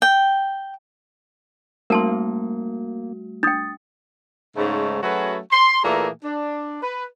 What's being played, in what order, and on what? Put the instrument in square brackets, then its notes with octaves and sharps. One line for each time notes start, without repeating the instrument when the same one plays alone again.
[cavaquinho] G5
[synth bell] G3 A3 F#4 [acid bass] A#3 [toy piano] A#4 A5 C6
[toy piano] D4 G5 [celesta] D#6 A6
[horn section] G#2 C#3 A3
F#3 A3 C#4 F#4 G#4 B4
C6
A#2 E3 A3 A#3 G#4 A#5
D4
B4